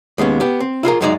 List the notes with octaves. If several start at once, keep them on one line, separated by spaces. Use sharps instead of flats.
D#2 G#3 B3 C#4
B3 G4
C4
E4 F4 G#4 A#4
F#2 F#3 G#3 D#4 G#4 D5